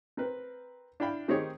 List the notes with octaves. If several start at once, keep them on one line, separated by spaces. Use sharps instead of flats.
C4 A#4 B4
D4 E4 F5 G5 B5
D#3 C4 D#4 G4 G#4 C#5